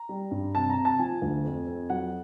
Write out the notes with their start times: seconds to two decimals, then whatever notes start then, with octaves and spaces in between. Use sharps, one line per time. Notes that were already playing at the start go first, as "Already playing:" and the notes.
Already playing: A#5
0.09 G3
0.31 G2
0.55 C3 A5
0.70 A#5
0.76 C3
0.85 A5
0.99 F3 G#5
1.22 D2
1.44 F2
1.67 F2
1.90 F#3 F#5